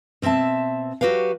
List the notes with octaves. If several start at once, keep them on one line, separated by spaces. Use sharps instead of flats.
B2 C4 G#4 E5 A5
F#3 F#4 G4 B4 F5